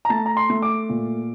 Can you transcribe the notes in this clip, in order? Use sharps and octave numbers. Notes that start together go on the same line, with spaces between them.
A#5
A3 A5
A#5
C6
A3
D6
A#2